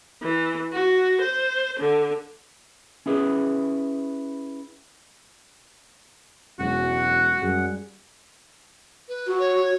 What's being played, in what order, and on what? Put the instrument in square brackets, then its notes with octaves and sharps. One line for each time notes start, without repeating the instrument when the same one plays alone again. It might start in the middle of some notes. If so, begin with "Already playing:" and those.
[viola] E3
F#4
C5
D3
[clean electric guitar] C#4 E4 G#4 B4
[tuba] E1 [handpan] F#3 G#3 C#4 [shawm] F#4 [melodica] F#5
[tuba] F#2 [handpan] G3 G#4
[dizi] B4
[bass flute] F#4
[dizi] C#5